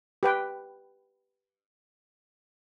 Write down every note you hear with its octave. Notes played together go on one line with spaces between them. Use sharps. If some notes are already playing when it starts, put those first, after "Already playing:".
G4 B4 G5